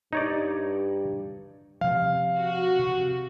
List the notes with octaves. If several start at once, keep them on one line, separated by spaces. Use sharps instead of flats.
G2 D#4 C#5 D5
C3 F3 F5
F#4
C3